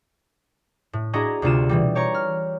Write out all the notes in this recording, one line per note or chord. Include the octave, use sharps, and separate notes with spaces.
A2
D4 E4 F#4 G#4 D#5 A#5
D2 C3 D4 F4 D#7 E7
B2 E3 G3
G4 C#5 A#5 C#6
F6